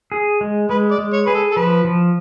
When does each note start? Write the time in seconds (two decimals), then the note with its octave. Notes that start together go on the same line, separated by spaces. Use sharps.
0.12 G#4
0.41 G#3
0.69 G#3 B4
0.91 D5
0.98 G#3
1.13 C#5
1.26 G#4 B4
1.35 A4
1.52 A4
1.56 F3 B4
1.85 F3